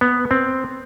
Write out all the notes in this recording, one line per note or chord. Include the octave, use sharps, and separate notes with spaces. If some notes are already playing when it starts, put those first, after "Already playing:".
B3
C4